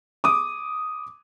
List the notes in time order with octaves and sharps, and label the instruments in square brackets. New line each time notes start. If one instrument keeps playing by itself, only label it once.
[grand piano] D6 D#6